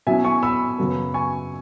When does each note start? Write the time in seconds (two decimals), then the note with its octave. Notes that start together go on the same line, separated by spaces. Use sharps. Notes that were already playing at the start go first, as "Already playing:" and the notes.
0.07 B2 F#3 C#4 E4 E5 G#5
0.24 G#5 C#6
0.43 B5 E6
0.78 F#2 C#3 F#3 B3
1.14 G#5 C#6